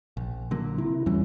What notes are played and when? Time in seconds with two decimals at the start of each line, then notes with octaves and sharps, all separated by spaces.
0.17 A#1
0.51 D3 F#3 A#3
0.78 C3 E4
1.06 E2 A2 E3 F#3 G3 C#4